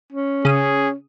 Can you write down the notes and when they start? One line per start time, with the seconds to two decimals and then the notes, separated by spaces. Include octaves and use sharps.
0.12 C#4
0.45 C#3 G#4 D#6